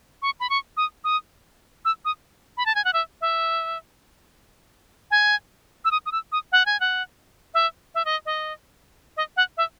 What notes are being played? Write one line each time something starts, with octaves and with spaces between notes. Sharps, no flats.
C#6
B5
C#6
D#6
D#6
E6
D#6
B5
A5
G#5
F#5
E5
E5
G#5
E6
D#6
D#6
E6
D#6
F#5
G#5
F#5
E5
E5
D#5
D#5
D#5
F#5
E5